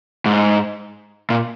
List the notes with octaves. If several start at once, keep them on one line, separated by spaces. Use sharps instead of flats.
G#2
A#2